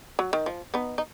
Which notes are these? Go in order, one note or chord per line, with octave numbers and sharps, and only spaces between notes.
F#3
D#3
F3
B3 D#4
D#4